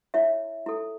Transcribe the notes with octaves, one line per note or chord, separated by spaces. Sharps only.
E4 C#5 E5
E4 A4